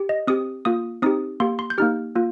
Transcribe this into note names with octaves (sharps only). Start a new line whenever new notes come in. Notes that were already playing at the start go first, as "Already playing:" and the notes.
Already playing: G4
D#5
C4 G4 D#6
A#3 F4 D#6
C4 D#4 G4 D#6
A#3 G4 C6
C6
G6
A#3 D#4 G4 F6
A#3 F4